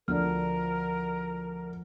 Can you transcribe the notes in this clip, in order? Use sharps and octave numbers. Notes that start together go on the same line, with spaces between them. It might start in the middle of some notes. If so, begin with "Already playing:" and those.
D2 F3 D4 A#4 F6